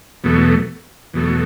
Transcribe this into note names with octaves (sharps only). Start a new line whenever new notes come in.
E2 B2 F#3 A3
E2 B2 F#3 A3